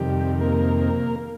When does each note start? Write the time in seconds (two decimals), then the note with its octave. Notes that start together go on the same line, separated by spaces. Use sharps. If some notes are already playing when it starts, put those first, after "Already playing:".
Already playing: F2 C3 D#3 G3 G4
0.41 A#3 A#4